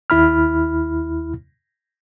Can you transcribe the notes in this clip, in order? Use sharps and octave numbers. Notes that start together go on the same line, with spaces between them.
D#2 E4 B5 F6